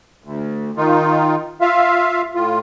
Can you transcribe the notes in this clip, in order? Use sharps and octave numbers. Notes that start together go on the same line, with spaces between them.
D2
D#3 D#4 F4
F4 E5 F5
A2 F4